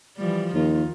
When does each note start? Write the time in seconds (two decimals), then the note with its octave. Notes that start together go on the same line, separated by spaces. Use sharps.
0.17 E3 F3 G3
0.55 D#2 D#3 F4